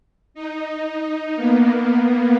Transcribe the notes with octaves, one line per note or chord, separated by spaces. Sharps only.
D#4
A#3 B3